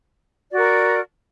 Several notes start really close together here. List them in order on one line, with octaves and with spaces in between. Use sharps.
D5 F#4 A#4